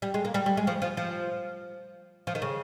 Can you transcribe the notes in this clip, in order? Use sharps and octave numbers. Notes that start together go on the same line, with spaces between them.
G3
G#3
A#3
G3
G3
G#3
F3
F3
F3
F3
D#3
C#3